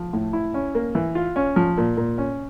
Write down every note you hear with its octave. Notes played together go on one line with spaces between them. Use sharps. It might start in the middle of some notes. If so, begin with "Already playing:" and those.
Already playing: F3
A2
E4
C#4
A#3
E3
F4
C#4
F3
A#2
A#2
C#4